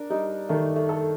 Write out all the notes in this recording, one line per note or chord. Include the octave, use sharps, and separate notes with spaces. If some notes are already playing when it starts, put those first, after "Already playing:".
Already playing: D4 A#4
G3 D#4
D#3 A3
A3
A4